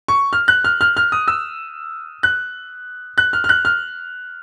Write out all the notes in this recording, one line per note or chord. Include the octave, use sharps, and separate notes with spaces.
C#6
F6
F#6
F6
F6
F6
D#6
E6
F#6
F#6
F6
F6
F#6
F6